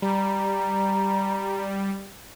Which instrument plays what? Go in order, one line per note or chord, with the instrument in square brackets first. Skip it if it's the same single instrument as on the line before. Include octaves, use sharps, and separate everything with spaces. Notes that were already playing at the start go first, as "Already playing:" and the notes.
[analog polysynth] G3 [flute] A#5